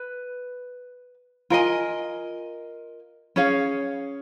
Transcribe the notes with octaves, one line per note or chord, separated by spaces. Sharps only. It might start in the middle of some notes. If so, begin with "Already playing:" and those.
Already playing: B4
F4 A#4 D#5 G#5
C#4 G#4 C#5 F5